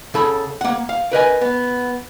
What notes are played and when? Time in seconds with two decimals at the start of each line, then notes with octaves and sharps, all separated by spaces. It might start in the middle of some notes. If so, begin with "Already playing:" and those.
0.14 C#3 A4 B5
0.61 A#3 F#5
0.89 F5
1.12 A#4 B4 D#5 G#5
1.41 B3